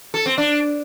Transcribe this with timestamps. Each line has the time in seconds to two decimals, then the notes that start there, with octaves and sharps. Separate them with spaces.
0.14 A4
0.26 C4
0.38 D4